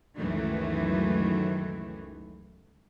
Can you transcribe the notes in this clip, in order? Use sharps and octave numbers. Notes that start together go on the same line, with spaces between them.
C#2 F#2 D#3 E3 F#3 A3